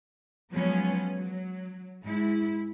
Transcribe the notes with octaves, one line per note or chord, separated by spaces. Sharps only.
F3 F#3 G#3 B3 C#4
F#3
G#2 G#3 E4